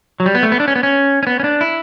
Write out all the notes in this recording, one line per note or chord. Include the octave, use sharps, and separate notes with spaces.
F#3
G3
B3
A3
B3
D4
C#4
B3
C#4
C#4
B3
C#4
D4
E4